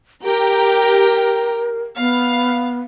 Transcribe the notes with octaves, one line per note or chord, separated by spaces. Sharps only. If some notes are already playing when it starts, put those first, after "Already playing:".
G4 A#4 G5 A#5
B3 F5